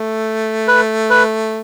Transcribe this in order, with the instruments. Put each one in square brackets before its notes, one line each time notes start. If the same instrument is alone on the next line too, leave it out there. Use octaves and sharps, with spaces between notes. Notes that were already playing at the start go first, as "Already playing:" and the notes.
Already playing: [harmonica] A3
[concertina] B4
B4